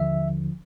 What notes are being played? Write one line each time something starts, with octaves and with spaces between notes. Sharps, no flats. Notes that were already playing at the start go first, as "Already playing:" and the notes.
Already playing: D#2 D3 F3 E5